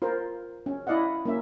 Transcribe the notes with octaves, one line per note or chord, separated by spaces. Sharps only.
F4 A#4 C5
C#4
E4 D5 D#5 F5 F#5
A#3 C#4 E5